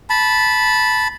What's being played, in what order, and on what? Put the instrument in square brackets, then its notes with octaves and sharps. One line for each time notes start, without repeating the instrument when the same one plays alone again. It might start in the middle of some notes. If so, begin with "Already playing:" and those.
[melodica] A5 B5